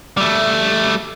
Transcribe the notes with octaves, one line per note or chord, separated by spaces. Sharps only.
G3 A3